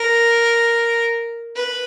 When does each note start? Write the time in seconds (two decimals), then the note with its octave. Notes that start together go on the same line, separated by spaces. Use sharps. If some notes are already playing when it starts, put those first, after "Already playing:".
Already playing: A#4
1.56 B4